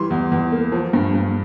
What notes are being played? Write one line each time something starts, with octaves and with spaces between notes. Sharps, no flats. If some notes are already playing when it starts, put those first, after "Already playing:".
Already playing: E3 G3 C6
E2
E2
A#3
F3
G2
G2